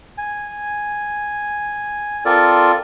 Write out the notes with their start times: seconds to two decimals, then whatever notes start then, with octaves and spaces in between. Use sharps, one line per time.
0.18 G#5
2.25 C4 F4 A4 A#4 D5